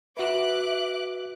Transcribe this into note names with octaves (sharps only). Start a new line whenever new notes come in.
F#4 B4 E5 D6 F#6